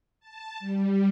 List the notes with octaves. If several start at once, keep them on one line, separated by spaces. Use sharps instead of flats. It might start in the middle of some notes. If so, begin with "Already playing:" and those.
A5
G3